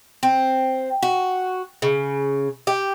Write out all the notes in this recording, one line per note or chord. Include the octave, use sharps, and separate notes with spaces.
C4
F#4
C#3
G4